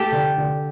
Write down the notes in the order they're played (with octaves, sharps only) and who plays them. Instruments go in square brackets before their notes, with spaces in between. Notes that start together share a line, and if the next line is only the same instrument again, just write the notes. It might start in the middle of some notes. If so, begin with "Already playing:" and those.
Already playing: [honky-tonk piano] A3 [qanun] G4 A4
[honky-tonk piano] D3
D3